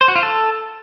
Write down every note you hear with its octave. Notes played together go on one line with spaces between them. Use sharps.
C5
F#4
F4
A4